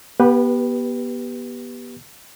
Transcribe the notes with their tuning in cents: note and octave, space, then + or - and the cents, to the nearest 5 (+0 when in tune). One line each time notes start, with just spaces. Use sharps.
B3 -30 G4 +0 B4 +0